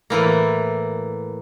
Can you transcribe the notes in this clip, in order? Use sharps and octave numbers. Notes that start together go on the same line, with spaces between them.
A2 E3 A#3